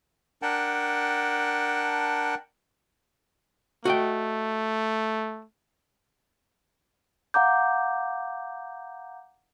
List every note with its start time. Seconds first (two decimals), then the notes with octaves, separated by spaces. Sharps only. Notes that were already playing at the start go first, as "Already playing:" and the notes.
0.42 D4 A#4 F#5 G5 A5
3.85 A3 F#4 D#5 G5
7.34 F5 F#5 A#5 D6 G6